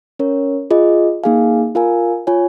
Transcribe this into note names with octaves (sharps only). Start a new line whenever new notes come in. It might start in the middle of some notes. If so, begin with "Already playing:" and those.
C#4 A#4 C#5
F4 G#4 D#5
A#3 D#4 G#4 F5 G#5
F4 A#4 F5 G#5
F4 C#5 G#5